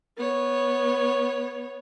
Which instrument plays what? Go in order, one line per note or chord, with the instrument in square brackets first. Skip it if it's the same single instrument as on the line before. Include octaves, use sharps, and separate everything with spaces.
[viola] B3 C#5